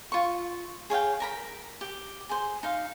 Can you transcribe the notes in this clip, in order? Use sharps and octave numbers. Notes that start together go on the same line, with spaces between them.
F4 C#6
G#4 C#5 F5 G5
A#4 A#5 B5
G4
G#4 C5
D#4 F5